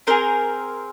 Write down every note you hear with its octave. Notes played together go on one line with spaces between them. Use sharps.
C4 E4 G#4 A#4 C5